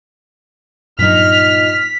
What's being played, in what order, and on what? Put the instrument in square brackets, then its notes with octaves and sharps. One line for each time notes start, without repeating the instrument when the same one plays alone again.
[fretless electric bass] G2 F#3 [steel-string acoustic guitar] A#2 D#4 [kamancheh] F6 [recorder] B6